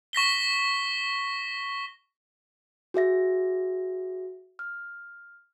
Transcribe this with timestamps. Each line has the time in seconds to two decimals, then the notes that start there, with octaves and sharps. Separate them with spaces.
0.13 C#6 A#6 B6 G7
2.94 F#4 G#4 E5 A#6
4.59 F6